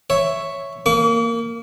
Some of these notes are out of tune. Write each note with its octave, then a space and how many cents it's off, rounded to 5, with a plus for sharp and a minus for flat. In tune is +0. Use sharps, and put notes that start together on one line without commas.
C#5 +0 E5 +5
A#3 -10 D6 -45